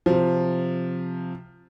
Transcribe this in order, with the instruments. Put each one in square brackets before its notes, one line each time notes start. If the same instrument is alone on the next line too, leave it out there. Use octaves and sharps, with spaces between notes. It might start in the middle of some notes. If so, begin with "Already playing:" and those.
[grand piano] C3 F3